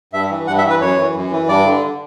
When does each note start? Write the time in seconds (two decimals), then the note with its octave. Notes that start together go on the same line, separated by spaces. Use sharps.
0.13 G2 E5
0.30 E3
0.47 G2 F#5
0.58 E5
0.64 E3
0.70 B4
0.81 F#2 C#5
0.98 E3
1.15 F#2
1.31 E3
1.48 G2 D5
1.65 D3